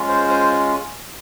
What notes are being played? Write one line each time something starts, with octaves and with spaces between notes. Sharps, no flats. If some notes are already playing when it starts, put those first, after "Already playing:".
Already playing: G#3 C#4 F4
C5
C5